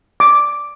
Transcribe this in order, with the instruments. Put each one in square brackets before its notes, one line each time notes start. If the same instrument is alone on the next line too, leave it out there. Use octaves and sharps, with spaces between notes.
[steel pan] D6